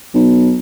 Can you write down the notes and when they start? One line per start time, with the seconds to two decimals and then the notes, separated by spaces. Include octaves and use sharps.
0.14 B1